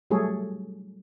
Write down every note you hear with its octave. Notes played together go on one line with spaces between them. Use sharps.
F#3 G3 A3 G#4 A4 C#5